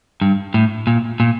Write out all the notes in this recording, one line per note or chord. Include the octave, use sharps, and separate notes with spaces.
G2
A2
A#2
A#2